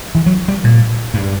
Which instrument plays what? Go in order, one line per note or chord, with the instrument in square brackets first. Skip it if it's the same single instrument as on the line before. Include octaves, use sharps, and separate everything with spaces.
[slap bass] E3
F#3
G3
A#2
G2